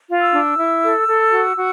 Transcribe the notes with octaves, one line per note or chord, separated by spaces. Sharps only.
F4
E6
D4
E4
A4
A4
F#4
F#4